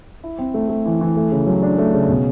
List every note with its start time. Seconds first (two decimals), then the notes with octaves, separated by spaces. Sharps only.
0.24 E4
0.39 C4
0.54 A3
0.69 A3
0.86 E3
1.01 E3
1.17 A3
1.32 C#3
1.47 F#3
1.63 D4
1.78 A3
1.94 C#3
2.09 B2